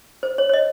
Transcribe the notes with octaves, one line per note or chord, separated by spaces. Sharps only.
C5
C#5
C#5
D#5